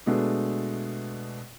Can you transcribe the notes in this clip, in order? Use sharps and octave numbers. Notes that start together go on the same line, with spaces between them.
B2 G#3 A3 B3 D4